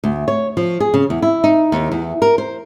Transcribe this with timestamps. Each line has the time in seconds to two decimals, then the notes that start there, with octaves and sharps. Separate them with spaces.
0.04 D2
0.28 C#5
0.57 F3
0.80 G#4
0.94 C#3
1.10 E2
1.22 E4
1.44 D#4
1.72 D#2
1.92 E2
2.22 A#4
2.38 C5